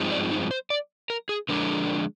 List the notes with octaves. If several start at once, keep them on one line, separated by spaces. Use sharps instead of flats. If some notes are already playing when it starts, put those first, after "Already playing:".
Already playing: G2 F3 G#3 C4 D#4
D5
D#4
C5
D5
A#4
G#4
D3 F3 G#3 D4 A#4